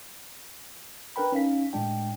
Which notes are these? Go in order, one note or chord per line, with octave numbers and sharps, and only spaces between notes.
D4 A#4 B4 G5 B5
C#4 D#4 F5 B6
A2 G#3 D4 G5